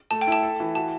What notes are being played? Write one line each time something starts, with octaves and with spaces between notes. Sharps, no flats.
A3 A5
G5
E4 A5
A4
E3
F#4 A5